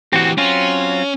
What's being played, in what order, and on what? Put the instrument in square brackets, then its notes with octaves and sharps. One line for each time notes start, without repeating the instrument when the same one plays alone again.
[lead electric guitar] E3 G4 [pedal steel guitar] C4 F#4
[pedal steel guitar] F#3 C4 F4 [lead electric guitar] C#4